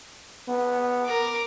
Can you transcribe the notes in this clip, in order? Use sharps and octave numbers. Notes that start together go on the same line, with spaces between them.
B3
A#4 D6